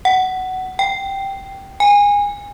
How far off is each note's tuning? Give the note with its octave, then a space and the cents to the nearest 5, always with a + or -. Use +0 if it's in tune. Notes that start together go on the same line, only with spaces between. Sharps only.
F#5 +15
G5 -5
G#5 -25